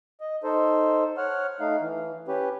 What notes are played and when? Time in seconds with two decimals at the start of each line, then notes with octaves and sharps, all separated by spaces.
0.21 D#5
0.44 D#4 A4 C5
1.18 C#5 F#5 F6
1.60 A3 D#4 F5
1.81 E3
2.28 C#4 G4 B4